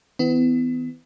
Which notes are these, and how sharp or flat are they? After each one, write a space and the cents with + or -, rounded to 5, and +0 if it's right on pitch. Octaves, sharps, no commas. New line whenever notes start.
D#3 +35 B3 +30 E4 +0